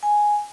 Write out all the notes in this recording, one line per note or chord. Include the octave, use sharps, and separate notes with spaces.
G#5